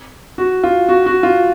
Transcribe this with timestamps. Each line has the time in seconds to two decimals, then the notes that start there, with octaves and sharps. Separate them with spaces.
0.38 F#4
0.64 F4
0.89 F#4
1.06 F#4
1.23 F4